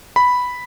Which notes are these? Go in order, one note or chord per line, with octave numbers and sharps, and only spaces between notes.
B5